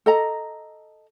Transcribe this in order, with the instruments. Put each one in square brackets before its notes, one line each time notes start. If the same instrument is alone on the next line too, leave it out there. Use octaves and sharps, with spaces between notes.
[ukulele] A4 D#5 A#5